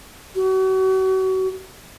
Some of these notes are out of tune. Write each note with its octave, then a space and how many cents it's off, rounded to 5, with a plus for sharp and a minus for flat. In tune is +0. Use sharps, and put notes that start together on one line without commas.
F#4 +35